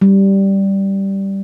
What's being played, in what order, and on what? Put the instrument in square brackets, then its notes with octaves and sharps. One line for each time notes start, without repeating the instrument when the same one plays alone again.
[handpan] G3